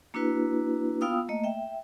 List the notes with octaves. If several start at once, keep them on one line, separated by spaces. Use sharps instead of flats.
A#3 D4 E4 F#4 B4
B3 F4 F5 G5 D#6 E6
A3 A#3 D#5
E5 G5